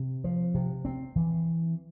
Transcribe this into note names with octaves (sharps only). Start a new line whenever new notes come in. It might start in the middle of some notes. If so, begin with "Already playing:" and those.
Already playing: C3
F3
C3
C4
E3